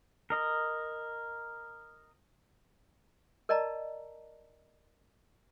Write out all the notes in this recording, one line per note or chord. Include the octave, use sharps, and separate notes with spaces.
A#4 D#5
A#4 D5 D#5 A5 A#5